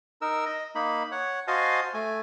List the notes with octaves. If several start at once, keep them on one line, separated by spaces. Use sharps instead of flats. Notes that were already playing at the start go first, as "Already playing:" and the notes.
D#4 A#4 E6
D#5
A#3 D#4 B5
C#5 F#5
F#4 C5 D#5 F5 G#5 A5
A3 G#5